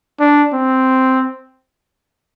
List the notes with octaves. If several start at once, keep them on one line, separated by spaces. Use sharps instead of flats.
D4
C4